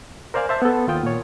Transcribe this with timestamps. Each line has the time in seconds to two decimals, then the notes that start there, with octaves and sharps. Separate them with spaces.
0.34 A#4 C5 D5 F5 G#5
0.49 C5 E5 A5
0.62 B3 A4
0.88 D#2 F4 G5 D#6
1.03 A#2 C#5